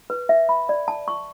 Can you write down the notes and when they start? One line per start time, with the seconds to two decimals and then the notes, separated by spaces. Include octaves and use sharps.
0.10 B4
0.29 E5
0.49 B5
0.69 D5
0.88 A5
1.08 C#6